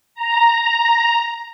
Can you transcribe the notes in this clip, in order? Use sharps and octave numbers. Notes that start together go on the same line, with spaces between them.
A#5